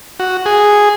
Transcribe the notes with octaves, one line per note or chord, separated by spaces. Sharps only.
F#4
G#4